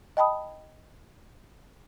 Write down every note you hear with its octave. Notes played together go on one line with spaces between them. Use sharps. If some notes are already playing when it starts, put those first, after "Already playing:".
D#5 G5 A5 B5 D#6